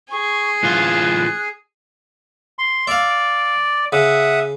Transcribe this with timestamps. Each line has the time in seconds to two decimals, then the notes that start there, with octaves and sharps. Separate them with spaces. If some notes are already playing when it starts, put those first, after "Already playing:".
0.11 G#4 C#6
0.63 A2 E3 F4 F#6
2.59 C6
2.87 D5 E5 F5
3.92 C#3 E5 F#5 D#6